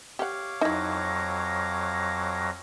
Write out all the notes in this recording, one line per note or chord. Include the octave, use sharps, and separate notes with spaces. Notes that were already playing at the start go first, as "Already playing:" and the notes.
G4 C#5 F5 F#5 D6
F2 F#3 D#4 E4 A#6